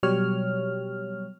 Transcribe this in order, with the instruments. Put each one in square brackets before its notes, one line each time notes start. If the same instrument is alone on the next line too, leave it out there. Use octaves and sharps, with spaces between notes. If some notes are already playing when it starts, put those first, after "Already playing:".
[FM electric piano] B2 F#3 G3 G4 C#5 F6